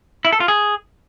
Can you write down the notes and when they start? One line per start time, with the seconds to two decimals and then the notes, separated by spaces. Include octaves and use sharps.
0.25 E4
0.33 A4
0.40 F4
0.48 G#4